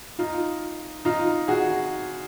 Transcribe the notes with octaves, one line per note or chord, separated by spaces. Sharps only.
D#4 F4
D#4 F4
F#4 G#4